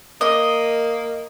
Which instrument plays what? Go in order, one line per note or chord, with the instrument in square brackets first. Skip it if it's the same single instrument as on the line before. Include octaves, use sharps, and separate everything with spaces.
[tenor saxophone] A#3 [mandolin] D#5